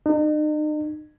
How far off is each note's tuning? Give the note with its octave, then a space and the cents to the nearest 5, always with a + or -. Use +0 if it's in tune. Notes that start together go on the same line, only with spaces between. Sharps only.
D#4 -40